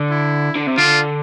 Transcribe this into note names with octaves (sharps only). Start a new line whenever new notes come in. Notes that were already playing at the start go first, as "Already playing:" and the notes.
Already playing: D3
E4
D3
C3
D3 F4